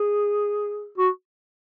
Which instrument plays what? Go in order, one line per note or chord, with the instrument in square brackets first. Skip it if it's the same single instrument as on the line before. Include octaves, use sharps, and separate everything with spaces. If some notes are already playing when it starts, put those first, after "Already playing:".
Already playing: [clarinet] G#4
F#4